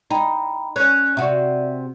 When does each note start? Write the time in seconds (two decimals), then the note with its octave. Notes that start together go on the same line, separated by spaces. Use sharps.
0.10 D#4 G5 A#5 B5
0.76 C#4 F#6
1.17 C3 F#4 D5 E5